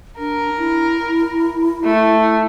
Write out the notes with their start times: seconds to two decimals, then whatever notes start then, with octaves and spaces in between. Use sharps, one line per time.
0.19 D4 A#4
0.58 E4
1.84 A3